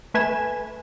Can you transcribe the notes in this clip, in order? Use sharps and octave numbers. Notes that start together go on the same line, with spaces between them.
A3 B4 G#5 E7